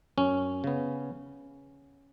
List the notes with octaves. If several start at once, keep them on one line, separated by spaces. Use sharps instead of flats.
F#2 C#4
C#3 B3